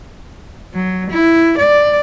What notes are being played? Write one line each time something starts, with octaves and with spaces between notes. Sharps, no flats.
F#3
E4
D5